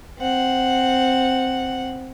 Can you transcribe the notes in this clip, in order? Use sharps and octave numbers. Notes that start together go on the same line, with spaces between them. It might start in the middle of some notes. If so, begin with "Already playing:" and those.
C4 F#5